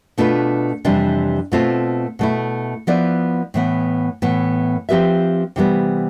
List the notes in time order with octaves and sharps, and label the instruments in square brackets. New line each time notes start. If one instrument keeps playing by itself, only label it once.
[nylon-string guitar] B2 A3 D4 F4 B4
F2 C3 E3 G3 D4
B2 A3 C4 F4 C5
B2 A3 E4
F3 B3 E4 B4 D5
A2 E3 B3
A2 E3 B3
F3 C4 G4 B4 E5
C3 E3 G3 B3